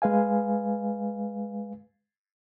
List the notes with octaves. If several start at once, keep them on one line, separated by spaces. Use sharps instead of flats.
G#3 B4 F5 G#5